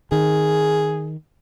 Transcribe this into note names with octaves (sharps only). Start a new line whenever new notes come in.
D#3 G#4